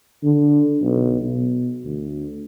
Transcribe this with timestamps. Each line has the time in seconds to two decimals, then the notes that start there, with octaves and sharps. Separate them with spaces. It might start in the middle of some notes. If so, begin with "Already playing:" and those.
0.23 D3
0.82 B1
1.22 B2
1.85 D2